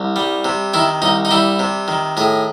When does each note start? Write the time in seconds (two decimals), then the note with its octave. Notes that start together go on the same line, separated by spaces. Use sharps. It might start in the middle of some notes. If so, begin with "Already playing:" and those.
Already playing: C2
0.16 G3
0.45 C3
0.74 D#3 E4
1.02 C2 D#4
1.25 D#4
1.31 G3 E4
1.59 C3
1.88 D#3
2.17 A2 G#4